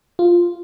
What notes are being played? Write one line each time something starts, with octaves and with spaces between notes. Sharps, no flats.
F4